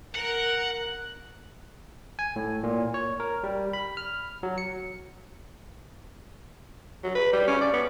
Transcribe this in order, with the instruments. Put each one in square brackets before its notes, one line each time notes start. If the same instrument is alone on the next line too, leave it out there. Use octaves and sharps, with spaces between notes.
[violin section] A#4 [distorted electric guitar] F#5 [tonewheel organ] F#6
[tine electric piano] G#5
A2
A#2
C#5
A#4
G3
B5
F6
F#3
C#7
[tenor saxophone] F#3
B4
G3
C#4
D5
B3